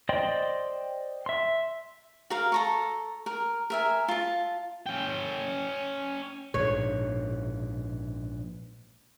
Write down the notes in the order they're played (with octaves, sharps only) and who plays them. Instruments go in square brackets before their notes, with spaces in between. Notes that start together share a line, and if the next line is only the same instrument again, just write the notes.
[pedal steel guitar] C5 D5 D#5 G5 C6
E5 C6
[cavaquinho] F#4 A#4 F5
A4 A#5 C#6
A#4
A#4 E5 G#5
F4 A5
[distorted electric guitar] C#4 G5
[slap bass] A#1 G#2 B2 [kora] C#5